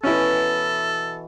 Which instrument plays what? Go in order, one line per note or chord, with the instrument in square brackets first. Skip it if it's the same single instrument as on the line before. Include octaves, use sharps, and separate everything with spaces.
[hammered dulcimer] B2 E3 [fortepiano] C#4 E4 [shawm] A4